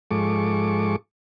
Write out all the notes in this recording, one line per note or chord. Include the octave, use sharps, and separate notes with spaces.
G#2 F3 G#3 A4 C#6 D6